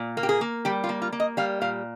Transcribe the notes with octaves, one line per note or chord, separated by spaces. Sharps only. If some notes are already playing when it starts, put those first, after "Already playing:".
Already playing: A#2
A#3
G4
G#4
A#3
G3 G4
F4
A#3
F4
A#3
D#5
G3 F5
A#2 F5